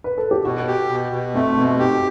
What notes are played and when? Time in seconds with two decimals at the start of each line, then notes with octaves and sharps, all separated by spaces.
0.04 B4
0.18 A4
0.31 G4
0.45 B2 F#4
0.68 G4
0.89 B2
1.12 B2
1.34 A3 C4
1.57 B2 C4
1.79 D#4 G4